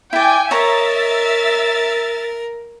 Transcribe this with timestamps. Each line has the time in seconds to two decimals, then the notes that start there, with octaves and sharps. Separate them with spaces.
0.13 E4 D5 G5 G#5
0.51 A#4 C#5 D#5 E5 A#5 A6